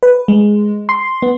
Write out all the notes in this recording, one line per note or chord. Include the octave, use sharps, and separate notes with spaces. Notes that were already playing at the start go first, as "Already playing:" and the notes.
B4
G#3
C6
B3